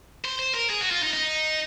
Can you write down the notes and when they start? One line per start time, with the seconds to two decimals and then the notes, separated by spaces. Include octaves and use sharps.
0.25 C5
0.39 C5
0.54 A#4
0.70 G#4
0.81 F#4
0.91 F4
1.03 D#4
1.14 D#4